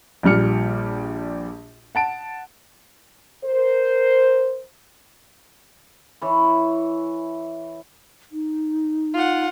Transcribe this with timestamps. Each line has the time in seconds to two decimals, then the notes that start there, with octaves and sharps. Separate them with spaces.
0.23 A#1 A#2 G3 F6 C#7
1.95 F#5 A5 D7
3.44 A#4 C5
6.22 E3 C#5
8.32 D#4
9.14 F4 F#5